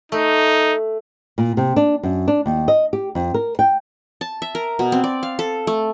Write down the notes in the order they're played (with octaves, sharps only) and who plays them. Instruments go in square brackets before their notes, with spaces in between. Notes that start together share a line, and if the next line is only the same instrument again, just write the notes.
[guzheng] A3 [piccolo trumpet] D#4
[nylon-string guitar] A#2
C3
D4
F#2
D4
D#2
D#5
G4
F2
A#4
G5
[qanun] A5
E5
A#4
B2
C4
D5
F5
A4
A3